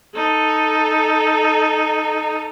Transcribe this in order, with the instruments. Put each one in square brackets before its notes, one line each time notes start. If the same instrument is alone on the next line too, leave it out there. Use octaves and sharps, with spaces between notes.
[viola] D#4 A4